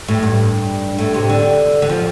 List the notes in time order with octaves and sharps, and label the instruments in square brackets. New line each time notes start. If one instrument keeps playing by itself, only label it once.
[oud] A2
G2
A2
C3
D3
D3
F3